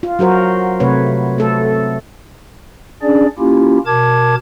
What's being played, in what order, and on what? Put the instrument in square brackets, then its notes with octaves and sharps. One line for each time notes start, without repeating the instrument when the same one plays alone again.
[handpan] F4
F#3 F#4 A#4 C5
C3 A3 B4 C#5
A3 A4
[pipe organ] C#4 D4 G#4 D5
A#3 C#4 E4 F4 G4
B2 A#4 A5 D6 G#6